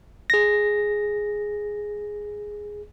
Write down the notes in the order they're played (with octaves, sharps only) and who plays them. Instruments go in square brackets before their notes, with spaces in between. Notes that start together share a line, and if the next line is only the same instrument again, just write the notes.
[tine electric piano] G#4 A#6